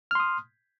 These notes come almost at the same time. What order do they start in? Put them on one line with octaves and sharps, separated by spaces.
F6 C6 D#6